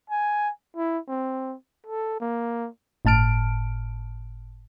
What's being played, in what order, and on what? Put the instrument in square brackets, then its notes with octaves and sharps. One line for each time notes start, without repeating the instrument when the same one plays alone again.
[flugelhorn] G#5
E4
C4
A4
A#3
[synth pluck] G1 A2 A5 F6 D7